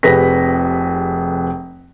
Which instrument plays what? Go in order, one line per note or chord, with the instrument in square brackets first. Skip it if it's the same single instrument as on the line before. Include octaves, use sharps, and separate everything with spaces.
[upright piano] F1 C3 G#4 B4 A#6 B6